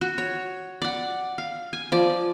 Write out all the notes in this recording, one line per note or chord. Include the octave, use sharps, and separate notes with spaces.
F#4
C#5
D5 F#5
F5
G#5
F3 D5